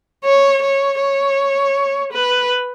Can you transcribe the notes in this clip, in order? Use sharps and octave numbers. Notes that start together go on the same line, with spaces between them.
C#5
C#5
C#5
B4